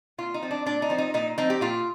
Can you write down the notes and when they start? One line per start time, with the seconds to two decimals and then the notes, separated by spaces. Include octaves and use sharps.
0.18 A#2 F4
0.34 D#4
0.42 F3 C4
0.51 D4
0.66 A#2 D4
0.82 D#4
0.90 F3 C4
0.98 D#4
1.14 A#2 D#4
1.38 F3 C4 D#4
1.50 G4
1.61 A#2 F4